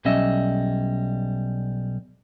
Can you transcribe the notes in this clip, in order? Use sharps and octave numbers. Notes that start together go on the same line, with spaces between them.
B1 G3 C#4 D#5 E5